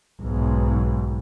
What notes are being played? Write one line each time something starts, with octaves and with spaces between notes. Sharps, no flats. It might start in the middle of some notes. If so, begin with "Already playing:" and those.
B1 G#2